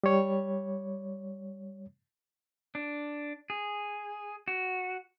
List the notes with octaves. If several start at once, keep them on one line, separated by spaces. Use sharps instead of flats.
G3 C#5
D4
G#4
F#4